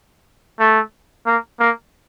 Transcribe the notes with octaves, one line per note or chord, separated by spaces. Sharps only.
A3
A#3
A#3